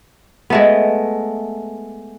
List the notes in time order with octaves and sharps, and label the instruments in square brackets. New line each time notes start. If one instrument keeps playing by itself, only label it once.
[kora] G#3 A3 B3